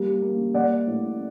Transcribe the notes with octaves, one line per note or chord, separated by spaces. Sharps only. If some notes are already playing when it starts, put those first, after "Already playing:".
Already playing: G3 A#3
A#3
A#3 D5 F#5
A2